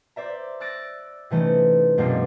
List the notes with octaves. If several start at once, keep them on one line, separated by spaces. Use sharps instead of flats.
C5 D5 E5 A#5
E6 F#6 A6 A#6 D7
C3 E3 A3 C#4 D#4
F#2 B2 G#3 A#3 C4 D4